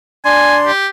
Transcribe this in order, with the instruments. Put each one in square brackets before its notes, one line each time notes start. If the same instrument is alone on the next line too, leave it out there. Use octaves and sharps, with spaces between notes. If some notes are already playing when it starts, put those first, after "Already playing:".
[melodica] D4 D5 C6 [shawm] G#5
[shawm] G4